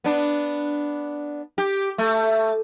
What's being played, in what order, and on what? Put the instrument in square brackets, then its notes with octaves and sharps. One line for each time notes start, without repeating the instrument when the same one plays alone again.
[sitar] B3 D4
G4
A3